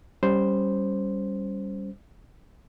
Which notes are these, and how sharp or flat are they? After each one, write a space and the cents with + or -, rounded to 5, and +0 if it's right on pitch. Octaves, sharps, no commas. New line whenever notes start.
G3 +0 C#4 +0 C5 +0